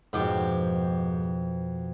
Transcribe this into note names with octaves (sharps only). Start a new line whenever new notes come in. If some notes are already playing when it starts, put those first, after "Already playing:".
F2 G#2 B2 G4 D6